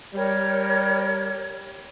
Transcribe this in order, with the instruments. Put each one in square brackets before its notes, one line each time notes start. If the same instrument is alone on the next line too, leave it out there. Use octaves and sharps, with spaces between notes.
[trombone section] G3 [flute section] A#4 C#5